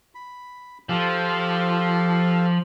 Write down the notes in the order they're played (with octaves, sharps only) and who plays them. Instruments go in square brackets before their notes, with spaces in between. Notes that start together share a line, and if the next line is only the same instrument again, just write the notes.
[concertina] B5
[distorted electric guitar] F3 [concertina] G4 A4 F5